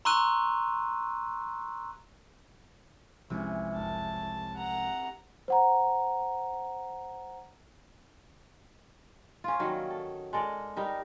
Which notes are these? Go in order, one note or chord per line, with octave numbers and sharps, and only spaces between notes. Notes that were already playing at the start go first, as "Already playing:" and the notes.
A#5 C6 C#6 E6 F#6 D#7
C2 C3 E3 F3 G#3 C#4
F#1 A5
F#5 A#5
C5 F#5 A#5
C#4 F4
D#3 F#3 G3 A#3
A4
G#3 A4 A#4 D5
G3 D#4 A#4